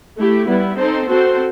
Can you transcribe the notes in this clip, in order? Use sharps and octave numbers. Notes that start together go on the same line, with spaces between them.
A3 E4 G4
G3 B3 E4
C4 D#4 A4 C5
C4 F#4 A4 C5